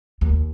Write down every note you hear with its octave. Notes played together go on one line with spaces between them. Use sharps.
D#2